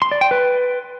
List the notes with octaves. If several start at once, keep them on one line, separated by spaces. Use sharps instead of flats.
C6
D5
G5
B4